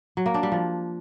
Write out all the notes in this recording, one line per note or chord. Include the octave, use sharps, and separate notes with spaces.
F#3
A#3
D4
G3
F3